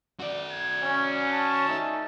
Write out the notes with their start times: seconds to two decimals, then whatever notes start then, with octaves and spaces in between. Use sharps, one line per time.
0.20 F#4 D5
0.52 G#6
0.84 C#4
1.34 A5
1.68 A3 D#4